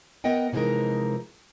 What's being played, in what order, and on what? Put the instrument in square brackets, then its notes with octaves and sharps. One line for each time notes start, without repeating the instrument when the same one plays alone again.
[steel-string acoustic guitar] B3 A#4 D#5 F#5 G5
C3 E3 F3 G#3 D#4 A#4